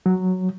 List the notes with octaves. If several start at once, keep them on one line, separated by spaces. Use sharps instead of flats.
F#3